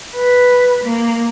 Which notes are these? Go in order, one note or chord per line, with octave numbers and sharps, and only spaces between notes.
B4
A#3